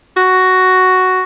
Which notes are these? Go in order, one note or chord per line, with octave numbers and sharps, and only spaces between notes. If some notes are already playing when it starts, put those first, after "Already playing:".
F#4